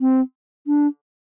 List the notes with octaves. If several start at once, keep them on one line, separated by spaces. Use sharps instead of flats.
C4
D4